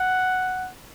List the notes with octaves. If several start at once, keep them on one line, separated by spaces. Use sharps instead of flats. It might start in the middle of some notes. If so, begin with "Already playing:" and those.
Already playing: F#5